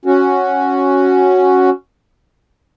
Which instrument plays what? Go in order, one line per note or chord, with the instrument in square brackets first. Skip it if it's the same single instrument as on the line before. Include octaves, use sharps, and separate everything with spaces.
[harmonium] C#4 F#4